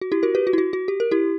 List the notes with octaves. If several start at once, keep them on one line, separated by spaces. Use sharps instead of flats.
F#4
E4 G4
F#4 A#4
G4 B4
F#4
E4
F#4
F#4
G4
A#4
E4 G4